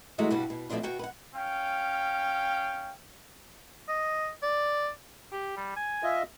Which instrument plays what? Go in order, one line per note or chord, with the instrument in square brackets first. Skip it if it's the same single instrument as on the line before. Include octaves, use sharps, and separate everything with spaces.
[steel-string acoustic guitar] E3 F#3 G#3 A3 F#4
G2 B2 G3 D4 F#4
B2
B2 F3 A3 C4 D4 F4
B2 F#4 G5
B4 F#5
[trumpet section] C#4 F5 G5
[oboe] D#5
D5
[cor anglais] G4
G3
G#5
[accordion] F4 D#5 E5